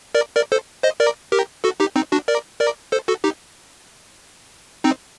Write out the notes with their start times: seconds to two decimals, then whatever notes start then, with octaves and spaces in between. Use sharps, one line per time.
0.15 A#4 D5
0.36 A#4 D5
0.52 A4 C5
0.83 C5 D#5
1.00 A#4 D5
1.32 G4 A#4
1.64 F#4 A4
1.80 D#4 G4
1.96 C4 D#4
2.12 D4 F#4
2.28 A#4 D5
2.60 A#4 D5
2.92 A4 C5
3.08 F#4 A4
3.24 D#4 G4
4.84 C4 D#4